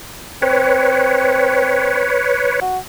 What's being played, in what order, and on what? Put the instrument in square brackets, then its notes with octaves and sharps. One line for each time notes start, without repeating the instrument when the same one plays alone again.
[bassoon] C4 [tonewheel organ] B4 C#5
[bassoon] F#4